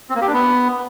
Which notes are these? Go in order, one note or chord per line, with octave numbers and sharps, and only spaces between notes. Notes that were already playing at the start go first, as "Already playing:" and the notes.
C4
A#3
G4
D4
B3